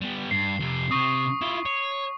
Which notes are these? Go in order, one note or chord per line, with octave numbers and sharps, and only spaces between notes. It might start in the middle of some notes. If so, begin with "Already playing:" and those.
G3 B3
G2 C7
F2 C3
C3 C4 C#6 D#6
E4 F4
C#5